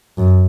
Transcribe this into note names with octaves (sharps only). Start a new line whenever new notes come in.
F#2